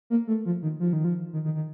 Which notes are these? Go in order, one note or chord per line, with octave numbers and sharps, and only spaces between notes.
A#3
A3
F3
D#3
F3
D#3
F3
D#3
D#3
D#3